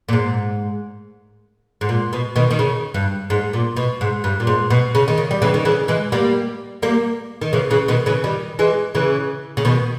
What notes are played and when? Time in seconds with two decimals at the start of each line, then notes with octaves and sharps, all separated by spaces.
0.09 A#2
0.13 G#2
1.81 G#2
1.89 A#2
2.13 B2
2.36 B2 D#3
2.50 D#3
2.59 C#3
2.94 G2
3.30 G#2
3.53 A#2
3.76 B2
4.01 G#2
4.24 G2
4.40 A#2
4.47 G#2
4.70 B2
4.95 C#3
5.08 D#3
5.18 C#3
5.31 G3
5.42 C#3 E3
5.54 D#3
5.65 C#3 E3
5.88 E3 G#3
6.12 G3 A#3
6.82 G3 A#3
7.42 D#3
7.53 C#3 E3
7.70 C#3 E3
7.88 B2 D#3
8.06 C#3 E3
8.24 D#3 G3
8.59 E3 G#3
8.95 C#3 E3
9.57 C#3
9.65 B2 D#3